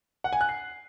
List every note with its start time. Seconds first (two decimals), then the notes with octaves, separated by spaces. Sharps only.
0.24 F#5
0.33 G#5
0.41 F#6
0.49 C7